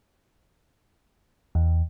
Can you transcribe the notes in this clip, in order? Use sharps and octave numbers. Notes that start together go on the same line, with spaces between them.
E2